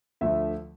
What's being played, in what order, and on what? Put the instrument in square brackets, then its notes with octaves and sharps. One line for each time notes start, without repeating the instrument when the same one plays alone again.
[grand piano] D2 D3 F3 A3 E5